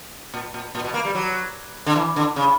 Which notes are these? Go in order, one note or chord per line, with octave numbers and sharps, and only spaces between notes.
A#2
A#2
A#2
B2
A#3
G3
F#3
D3
E3
D3
C#3